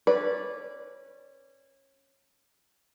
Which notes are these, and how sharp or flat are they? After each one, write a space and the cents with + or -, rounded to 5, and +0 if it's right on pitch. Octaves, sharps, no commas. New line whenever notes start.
C#4 -25 B4 -15 D5 -10